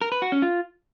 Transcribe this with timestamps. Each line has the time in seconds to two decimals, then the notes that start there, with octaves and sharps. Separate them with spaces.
0.01 A#4
0.12 B4
0.22 F#4
0.32 C#4
0.42 F4